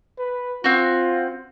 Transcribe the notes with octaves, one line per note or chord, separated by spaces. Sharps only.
B4
C4 F4 F#4